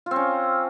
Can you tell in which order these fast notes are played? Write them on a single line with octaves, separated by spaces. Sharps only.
F4 C4 C#4